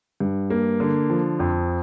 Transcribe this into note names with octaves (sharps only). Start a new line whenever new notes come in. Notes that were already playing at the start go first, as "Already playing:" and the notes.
G2
A#3
D3
F3
F2